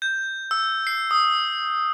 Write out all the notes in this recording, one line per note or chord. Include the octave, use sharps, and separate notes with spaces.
G6
E6
C7
D#6